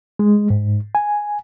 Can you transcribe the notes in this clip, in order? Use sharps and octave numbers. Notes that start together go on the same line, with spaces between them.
G#3
G#2
G#5